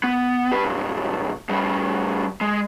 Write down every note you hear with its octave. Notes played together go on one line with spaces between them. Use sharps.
B3
G4 B4
B1 G2
A2 G3
G#3